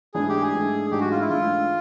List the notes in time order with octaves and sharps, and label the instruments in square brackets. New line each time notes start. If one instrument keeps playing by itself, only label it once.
[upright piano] G#2 E3 A3 D4 [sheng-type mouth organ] G#4
[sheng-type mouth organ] G4
G#4
[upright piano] G#2 E3 A3 D4
[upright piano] G#2 E3 A3 D4 [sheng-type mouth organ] G4
[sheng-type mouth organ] F#4
F4
E4
[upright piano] G#2 E3 A3 D4 [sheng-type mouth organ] F4